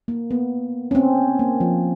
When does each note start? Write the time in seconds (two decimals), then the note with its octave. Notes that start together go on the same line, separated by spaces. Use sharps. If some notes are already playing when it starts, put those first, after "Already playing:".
0.08 A#3
0.31 B3
0.91 C#4
0.95 C4
1.39 A#3
1.60 F3